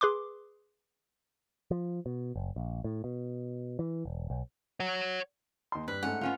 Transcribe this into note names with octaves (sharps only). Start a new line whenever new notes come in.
G#4 B4 C6 D6
F3
B2
F#1
A#1
A2
B2
E3
E1
B1
C#5 F#5
D#2 C6
G2 B4
G#2 A3 C#4 F#5
B3 C#4 F4